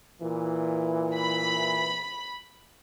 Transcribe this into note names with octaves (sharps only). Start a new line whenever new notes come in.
A#2 E3
B5